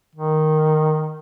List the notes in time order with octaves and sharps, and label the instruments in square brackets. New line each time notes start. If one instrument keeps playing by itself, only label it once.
[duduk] D#3